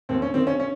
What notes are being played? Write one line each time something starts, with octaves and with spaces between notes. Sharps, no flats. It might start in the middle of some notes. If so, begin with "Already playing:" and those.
D#2 C4
C#4
D#3 C4
C#4
C#4